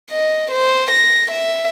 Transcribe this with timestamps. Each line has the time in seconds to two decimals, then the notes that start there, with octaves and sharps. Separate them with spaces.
0.10 D#5
0.51 C5
0.91 A#6
1.30 E5